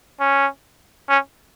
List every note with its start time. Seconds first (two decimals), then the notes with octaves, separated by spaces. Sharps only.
0.20 C#4
1.09 C#4